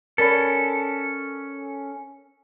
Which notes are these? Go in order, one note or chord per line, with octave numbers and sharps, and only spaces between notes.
C#4 A4 A#4 D5 B5